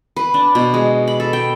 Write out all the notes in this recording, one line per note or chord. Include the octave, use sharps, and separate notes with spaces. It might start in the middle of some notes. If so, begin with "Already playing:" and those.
B4
D4
B2
G#3
B5
A4
G5